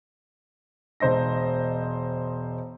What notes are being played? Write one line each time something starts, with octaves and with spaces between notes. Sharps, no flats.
E1 C5 D#5 A#6